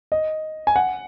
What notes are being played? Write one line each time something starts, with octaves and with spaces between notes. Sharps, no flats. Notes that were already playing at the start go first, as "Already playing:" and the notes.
D#5
G#5
F#5